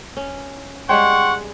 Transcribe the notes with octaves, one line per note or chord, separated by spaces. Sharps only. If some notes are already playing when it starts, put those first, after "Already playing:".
C#4
G3 G#3 C#5 F#5 G5 C6 C#6